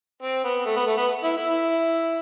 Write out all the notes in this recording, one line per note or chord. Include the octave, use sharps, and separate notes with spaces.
C4
B3
A3
B3
A3
B3
E4
E4